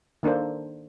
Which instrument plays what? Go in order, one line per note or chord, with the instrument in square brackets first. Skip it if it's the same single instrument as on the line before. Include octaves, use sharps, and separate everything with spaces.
[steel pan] D#3 A#3 D4 A4 C5